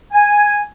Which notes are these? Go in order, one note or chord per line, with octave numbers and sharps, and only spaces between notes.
G#5